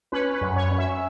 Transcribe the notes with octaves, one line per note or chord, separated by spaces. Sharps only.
C#4 B4
B4
F#2
C#5
C#4
E5